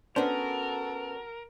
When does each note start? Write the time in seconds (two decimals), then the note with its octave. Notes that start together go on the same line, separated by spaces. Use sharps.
0.16 B3 C#4 D4 F#4 A4 A#4 C5